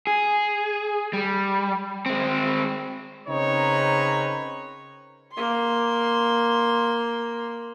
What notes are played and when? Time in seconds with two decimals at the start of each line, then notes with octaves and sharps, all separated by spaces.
0.07 G#4
1.13 G3
2.06 G#3 C4
3.27 C#3 C4 D#4 A#4 B4 C#5
5.33 A#3 C6